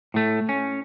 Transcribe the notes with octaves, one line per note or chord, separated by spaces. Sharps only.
A2 A3
C#4